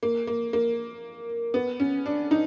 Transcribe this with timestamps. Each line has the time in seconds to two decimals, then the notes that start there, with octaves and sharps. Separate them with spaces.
0.03 A#3
0.27 A#3
0.53 A#3
1.54 B3
1.80 C#4
2.06 D4
2.31 D#4